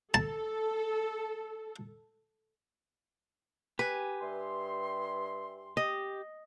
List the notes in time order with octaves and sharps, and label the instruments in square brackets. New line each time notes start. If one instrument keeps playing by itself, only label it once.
[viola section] A4 [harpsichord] A5
[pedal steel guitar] G4 G#5 [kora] B4
[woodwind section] G2 E5 C6
[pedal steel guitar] G4 [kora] D#5